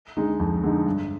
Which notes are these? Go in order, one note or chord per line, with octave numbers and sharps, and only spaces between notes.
D3 G#3 D#4
F2
D3 G#3 D#4
G2